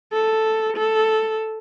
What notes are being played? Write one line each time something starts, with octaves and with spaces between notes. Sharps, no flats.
A4
A4